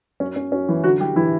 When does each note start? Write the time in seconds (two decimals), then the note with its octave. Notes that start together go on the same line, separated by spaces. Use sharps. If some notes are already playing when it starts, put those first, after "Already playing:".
0.20 F#2 C#4
0.36 C#4
0.52 F#2 C#4
0.68 E3 E4
0.84 D3 F#3 F#4
1.00 G3 G4
1.16 D3 E3 E4